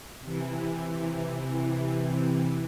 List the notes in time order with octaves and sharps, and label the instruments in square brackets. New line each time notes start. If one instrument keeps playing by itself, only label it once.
[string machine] C3 E3